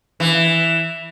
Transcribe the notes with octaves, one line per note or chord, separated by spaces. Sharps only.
E3